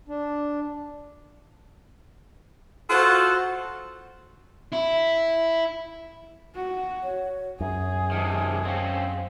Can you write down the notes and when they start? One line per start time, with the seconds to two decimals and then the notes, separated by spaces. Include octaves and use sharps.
0.08 D4
2.90 F4 F#4 A4 C5 F#5
4.72 E4
6.55 F#4
7.03 C#5
7.60 F#2 G#4 G#5
8.11 C3 D#3 A5
8.65 C4 C#4 F5